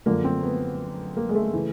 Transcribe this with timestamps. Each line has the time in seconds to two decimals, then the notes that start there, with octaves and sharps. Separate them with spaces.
0.06 F#2 D3 F3 A#3
0.24 C4
0.43 B3
1.17 A#3
1.29 G#3
1.35 A3
1.53 C#3 E3